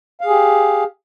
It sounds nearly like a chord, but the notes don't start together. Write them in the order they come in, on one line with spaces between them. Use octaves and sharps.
F5 G#4 G4